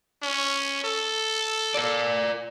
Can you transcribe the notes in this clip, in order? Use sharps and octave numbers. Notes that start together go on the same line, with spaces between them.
C#4
A4
A#4 D5